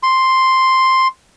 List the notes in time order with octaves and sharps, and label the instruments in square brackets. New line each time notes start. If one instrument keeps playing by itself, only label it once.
[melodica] C6